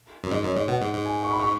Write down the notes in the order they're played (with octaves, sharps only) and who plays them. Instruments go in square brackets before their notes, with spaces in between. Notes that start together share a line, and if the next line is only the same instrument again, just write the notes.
[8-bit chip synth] F#2
[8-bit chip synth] G#2 [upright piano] D#5
[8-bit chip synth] F#2 [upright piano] C#5
[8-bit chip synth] G#2 [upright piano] D#5
[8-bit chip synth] B2 [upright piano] F#5
[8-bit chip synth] G#2
G#2
[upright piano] G#5
C#6
B5
C#6